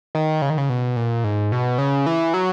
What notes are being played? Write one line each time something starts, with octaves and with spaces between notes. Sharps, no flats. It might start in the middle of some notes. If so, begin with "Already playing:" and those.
D#3
C#3
D#3
C#3
B2
A#2
G#2
B2
C#3
E3
F#3